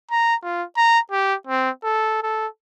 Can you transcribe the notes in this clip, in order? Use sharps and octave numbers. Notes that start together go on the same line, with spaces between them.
A#5
F4
A#5
G4
C4
A4
A4